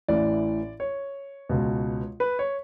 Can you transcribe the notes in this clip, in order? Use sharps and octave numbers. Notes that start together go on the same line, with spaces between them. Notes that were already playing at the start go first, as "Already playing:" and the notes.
A1 A2 E3 D5
C#5
C#2 B2
B4
C#5